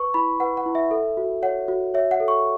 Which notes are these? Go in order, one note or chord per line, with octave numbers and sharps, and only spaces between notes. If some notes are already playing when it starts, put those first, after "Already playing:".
Already playing: B4 C#6
E4 B5
B4 F#5
F#5
E4
E5
A4
F#4
C#5 F#5
F#4
C#5 E5
F#5
A4
C#6